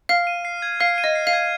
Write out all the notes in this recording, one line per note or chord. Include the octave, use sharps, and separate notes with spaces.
F5 F6
D#7
C7
G#6
F5 F6
D#7
D#5
C7
F5
G#6